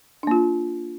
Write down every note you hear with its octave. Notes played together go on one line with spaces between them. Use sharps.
A#3 D4 F4